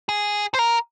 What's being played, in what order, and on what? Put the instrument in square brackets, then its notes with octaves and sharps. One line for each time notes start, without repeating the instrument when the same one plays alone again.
[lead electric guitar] G#4
C5
A#4